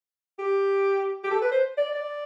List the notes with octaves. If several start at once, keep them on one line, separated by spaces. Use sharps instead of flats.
G4
G4
A4
B4
C5
D5
D5